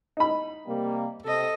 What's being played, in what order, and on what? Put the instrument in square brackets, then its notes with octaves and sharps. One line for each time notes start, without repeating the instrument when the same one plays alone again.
[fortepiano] D#4 B5
[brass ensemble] C3 G3 A#3
[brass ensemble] C3 [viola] A4 D#5